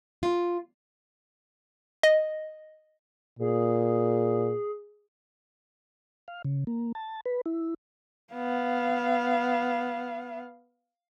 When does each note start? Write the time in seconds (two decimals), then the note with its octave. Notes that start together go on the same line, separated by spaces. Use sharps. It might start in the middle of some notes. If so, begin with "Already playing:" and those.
0.23 F4
2.03 D#5
3.39 A#2 G#4
6.28 F5
6.45 C#3
6.67 A#3
6.95 A5
7.26 B4
7.46 E4
8.33 B3 F5